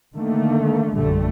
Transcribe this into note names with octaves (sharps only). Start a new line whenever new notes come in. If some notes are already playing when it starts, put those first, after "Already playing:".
D3 D#3 A3 A#3
A#1 F#2 D3 G3 A3